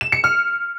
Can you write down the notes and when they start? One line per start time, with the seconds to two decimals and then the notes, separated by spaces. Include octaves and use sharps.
0.01 E7
0.12 C#7
0.24 F6